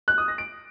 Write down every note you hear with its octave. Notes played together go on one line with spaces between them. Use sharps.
F#6
D#6
A#6
D7